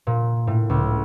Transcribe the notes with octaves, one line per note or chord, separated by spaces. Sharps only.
A#2
A2
C#2